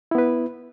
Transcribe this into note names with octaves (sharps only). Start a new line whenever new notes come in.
B3 E4 B4